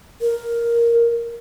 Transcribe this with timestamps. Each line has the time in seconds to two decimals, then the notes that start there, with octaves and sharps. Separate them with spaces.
0.21 A#4